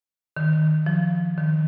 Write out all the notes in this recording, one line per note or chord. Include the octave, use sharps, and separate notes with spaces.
D#3
F3
D#3